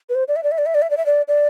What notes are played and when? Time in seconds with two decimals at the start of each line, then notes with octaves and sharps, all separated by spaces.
0.09 B4
0.15 C5
0.28 D5
0.36 E5
0.43 D5
0.52 E5
0.58 D5
0.66 E5
0.75 D5
0.82 E5
0.90 D5
0.97 E5
1.06 D5
1.28 D5